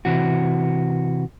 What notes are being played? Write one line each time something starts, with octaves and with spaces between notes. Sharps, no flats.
C3 E3 F#4